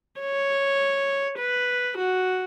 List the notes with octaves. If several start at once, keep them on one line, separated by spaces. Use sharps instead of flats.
C#5
B4
F#4